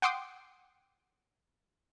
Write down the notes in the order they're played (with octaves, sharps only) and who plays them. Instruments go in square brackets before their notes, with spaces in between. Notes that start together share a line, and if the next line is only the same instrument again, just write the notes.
[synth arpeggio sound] F#5 G5 C6 D6 D#6